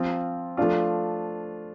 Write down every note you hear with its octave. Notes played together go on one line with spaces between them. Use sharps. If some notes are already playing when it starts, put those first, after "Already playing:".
Already playing: F3 C4 F4
F3 A3 D4 F4